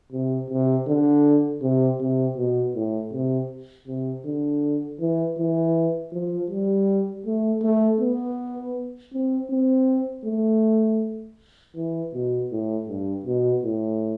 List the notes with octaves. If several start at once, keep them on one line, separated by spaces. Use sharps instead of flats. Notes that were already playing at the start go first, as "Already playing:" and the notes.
C3
C3
D3
C3
C3
B2
A2
C3
C3
D3
E3
E3
F3
G3
A3
A3
B3
C4
C4
A3
E3
B2
A2
G2
B2
A2